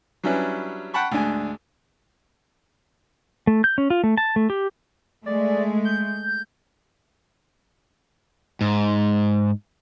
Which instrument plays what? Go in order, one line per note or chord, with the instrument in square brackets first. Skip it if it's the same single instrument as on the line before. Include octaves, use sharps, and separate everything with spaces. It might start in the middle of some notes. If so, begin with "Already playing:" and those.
[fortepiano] F#3 G3 C#4 D4 E4 B4
F#5 G5 A5 B5 C#6
D2 G#2 D4 G#5
[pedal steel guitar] A3
G6
C#4
F4
A3
A5
A3
G4
[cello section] G#3 A3 [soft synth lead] D5
[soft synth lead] G6
[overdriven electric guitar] G#2